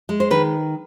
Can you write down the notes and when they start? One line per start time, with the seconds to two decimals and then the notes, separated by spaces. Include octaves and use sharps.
0.09 G#3
0.20 C5
0.31 D#3 B4